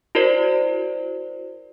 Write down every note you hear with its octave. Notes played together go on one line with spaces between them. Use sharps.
E4 F#4 A#4 C5 D5